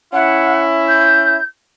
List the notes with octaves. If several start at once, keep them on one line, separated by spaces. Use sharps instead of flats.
C#4 E4 F#5
G6